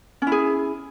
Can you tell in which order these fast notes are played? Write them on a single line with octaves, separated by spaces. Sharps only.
C#4 E4 G#4